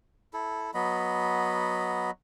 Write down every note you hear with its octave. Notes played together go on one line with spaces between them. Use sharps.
E4 A4
F#3 B3 D#5 B5